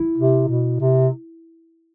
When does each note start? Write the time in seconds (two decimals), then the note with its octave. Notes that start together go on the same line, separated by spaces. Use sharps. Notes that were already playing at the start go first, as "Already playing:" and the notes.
Already playing: E4
0.18 C3
0.49 B2
0.80 C3